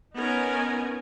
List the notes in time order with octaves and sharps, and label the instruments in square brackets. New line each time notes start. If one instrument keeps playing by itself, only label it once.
[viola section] B3 C#4 D#4 A#4 G#5